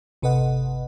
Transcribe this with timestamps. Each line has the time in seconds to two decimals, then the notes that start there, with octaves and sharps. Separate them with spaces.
0.22 G1 C3 A4 B4 D#5 F#5